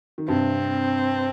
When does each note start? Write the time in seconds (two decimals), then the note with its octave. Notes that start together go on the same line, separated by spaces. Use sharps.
0.18 D#3
0.28 G2 C3 C4